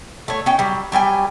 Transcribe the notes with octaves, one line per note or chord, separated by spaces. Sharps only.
A3 C#5
C#4 D#4 G5
F#3 G3
F#3 G3 G5 G#5